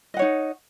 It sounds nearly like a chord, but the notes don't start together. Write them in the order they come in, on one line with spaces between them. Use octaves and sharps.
D#5 F#5 C#5 D#4